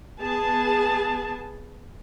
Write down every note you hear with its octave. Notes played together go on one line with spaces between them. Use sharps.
B3 G#4 A5